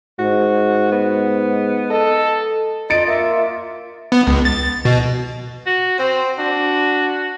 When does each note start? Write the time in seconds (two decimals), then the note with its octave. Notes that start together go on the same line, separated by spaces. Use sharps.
0.19 G#2 F#4
0.92 B3
1.91 A4 D#5
2.90 F4 D#5 A6 C#7 D7
3.08 A#3 E5
4.12 B3
4.27 C#2
4.45 A6
4.85 B2
5.66 F#4
5.99 C4 C5
6.38 D4 F#4